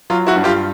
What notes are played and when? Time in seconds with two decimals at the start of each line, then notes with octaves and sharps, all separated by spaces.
0.10 F#3 F4
0.27 E4 F#4
0.36 G2
0.44 F4 G4